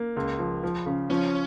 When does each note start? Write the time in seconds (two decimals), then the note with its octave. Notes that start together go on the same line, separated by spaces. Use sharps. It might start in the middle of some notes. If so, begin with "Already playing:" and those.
Already playing: A#3
0.16 C#2
0.39 F3
0.63 F3
0.86 C#3
1.10 F3 C#4